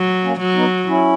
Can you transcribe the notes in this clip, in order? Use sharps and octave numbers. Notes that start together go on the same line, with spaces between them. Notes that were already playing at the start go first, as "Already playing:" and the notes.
Already playing: F#3
A#3 C#4
F#3
B3 D#4
C#4 E4